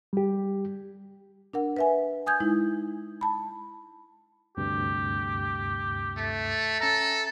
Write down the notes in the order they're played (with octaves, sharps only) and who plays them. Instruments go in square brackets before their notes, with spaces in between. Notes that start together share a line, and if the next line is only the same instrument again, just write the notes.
[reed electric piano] G3 G4
[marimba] D4 A#4 F#5
B4 E5 G#5
G#5 D#6 G6 G#6
G#3 D#4 E4
A5 B5
[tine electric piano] D2 G2 C3 [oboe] G4
[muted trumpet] A3
[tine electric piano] C#4 E5 [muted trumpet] A4 [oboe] A#5